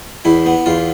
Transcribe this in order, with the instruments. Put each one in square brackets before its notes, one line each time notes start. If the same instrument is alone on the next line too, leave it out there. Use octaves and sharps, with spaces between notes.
[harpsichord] E2 E4
B3
E2 F4